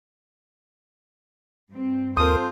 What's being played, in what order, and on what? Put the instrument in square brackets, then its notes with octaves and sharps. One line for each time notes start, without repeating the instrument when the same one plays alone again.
[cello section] G2 C4
[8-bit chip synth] D#2 A#4 [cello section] C4 [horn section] F4 A4 C5 [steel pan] D#6